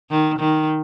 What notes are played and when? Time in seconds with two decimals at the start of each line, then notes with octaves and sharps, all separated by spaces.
0.11 D#3
0.39 D#3